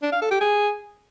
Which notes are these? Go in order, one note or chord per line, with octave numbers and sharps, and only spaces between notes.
D4
F5
A4
G4
G#4